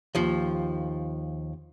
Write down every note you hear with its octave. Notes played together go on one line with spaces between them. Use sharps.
D#2 F3